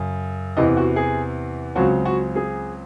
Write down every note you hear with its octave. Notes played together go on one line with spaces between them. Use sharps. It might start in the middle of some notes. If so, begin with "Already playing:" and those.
Already playing: F#2 C#3
E2 C3 E3 D#5
F#4
G#4
C#2 C#3 F#3 C4 F#4
F#4
G#4